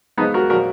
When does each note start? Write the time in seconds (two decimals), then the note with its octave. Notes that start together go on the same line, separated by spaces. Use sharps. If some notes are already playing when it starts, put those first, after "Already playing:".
0.18 G#2 B3 D#4
0.20 F3
0.34 F#4 A#4
0.50 A#2 F#4 A#4
0.53 F3